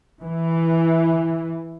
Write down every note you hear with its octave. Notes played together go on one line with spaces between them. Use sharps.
E3